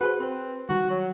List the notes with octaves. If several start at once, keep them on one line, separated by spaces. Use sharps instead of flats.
F#4 G#4 B4 C5
C4 B4 C5
D#3 G3 F#4
F#3